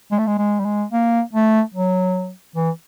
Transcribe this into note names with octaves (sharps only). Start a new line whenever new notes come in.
G#3
A3
G#3
G#3
G3
G#3
A#3
A3
F#3
E3